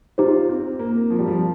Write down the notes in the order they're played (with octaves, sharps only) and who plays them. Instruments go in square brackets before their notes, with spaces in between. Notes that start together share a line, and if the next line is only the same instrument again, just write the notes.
[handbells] D#4 G4 C5 [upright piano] F4
[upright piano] C4
A#3
F3
G3
F3